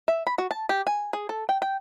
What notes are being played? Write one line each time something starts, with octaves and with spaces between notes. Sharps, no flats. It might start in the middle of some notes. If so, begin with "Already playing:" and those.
E5
B5
F#4
A5
G4
G#5
G#4
A4
G5
G5